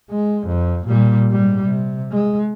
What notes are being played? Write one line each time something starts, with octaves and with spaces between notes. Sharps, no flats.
G#3
F2
A#2 G3
G#2 G3
C3
G#3